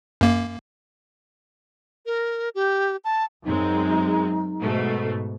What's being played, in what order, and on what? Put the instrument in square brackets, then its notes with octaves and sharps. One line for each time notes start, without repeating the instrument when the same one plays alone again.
[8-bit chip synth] F#2 A#3
[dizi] A#4
G4
A5
[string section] F#2 G#3 C4 [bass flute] D#4
[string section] G#2 B2 A3